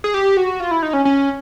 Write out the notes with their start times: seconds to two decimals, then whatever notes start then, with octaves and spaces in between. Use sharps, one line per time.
0.04 G#4
0.14 G4
0.37 F#4
0.60 F4
0.71 E4
0.83 D#4
0.93 C#4
1.05 C#4